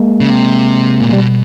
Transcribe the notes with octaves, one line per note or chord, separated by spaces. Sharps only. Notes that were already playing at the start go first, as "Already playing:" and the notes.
Already playing: G#3 A#3
C#3
C3
A#2
B2 G3